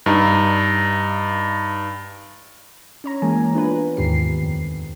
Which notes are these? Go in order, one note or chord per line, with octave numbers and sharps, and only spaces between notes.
G2 D#4 A#5
C#4 C#5 A#5
E3 G#3 A#3 G#5
B3 D4 F4 B4
D#2 G#2 D#3 G4 C7
F2